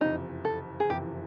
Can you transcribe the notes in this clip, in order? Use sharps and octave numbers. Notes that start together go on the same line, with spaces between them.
F#1 F2 C3 E3 D#4
A4
G#4
F#1 F2 C3 E3 G4